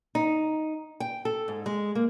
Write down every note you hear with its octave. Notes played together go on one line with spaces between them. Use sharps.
D#4
G5
A4
G#2
G#3
A#3